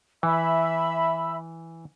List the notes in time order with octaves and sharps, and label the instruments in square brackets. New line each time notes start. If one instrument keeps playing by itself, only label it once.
[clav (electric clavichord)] E3 [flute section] E5 B5 E6